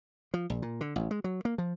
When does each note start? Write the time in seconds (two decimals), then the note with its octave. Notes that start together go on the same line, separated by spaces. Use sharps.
0.34 F3
0.50 A#1
0.62 A#2
0.81 D3
0.96 A1
1.11 G#3
1.24 F#3
1.45 A#3
1.58 F3